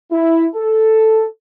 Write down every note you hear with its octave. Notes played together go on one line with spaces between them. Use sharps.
E4
A4